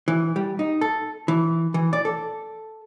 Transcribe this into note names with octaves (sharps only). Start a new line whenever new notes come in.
E3
G3
D#4
A4
E3
E3
D5
A4